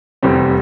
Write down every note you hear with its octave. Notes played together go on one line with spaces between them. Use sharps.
F1 E2 C3 G3 C4